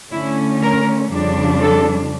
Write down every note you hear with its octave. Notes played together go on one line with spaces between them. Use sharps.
D3 A3 C#4 E4
A#4
F2 C#3 G3 D4
A4